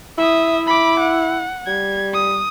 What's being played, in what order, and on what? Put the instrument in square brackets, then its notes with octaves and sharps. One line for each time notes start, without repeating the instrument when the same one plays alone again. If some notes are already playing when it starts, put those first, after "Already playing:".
[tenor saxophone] E4 [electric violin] E5 D#6
[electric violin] B5 D6
F#5
[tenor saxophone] G3 [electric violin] G#6
[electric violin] D#6